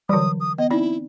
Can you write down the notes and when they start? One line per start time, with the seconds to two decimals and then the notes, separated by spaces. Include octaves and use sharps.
0.09 D3 E3 F#3 G3 D#6
0.40 D#6
0.58 B3 D#5
0.70 C4 D#4 E4 D5